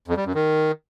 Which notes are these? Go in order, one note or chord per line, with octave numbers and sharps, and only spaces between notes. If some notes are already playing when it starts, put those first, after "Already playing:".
F2
G3
F#2
D#3